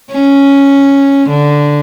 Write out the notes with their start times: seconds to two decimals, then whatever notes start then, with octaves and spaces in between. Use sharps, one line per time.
0.12 C#4
1.30 D3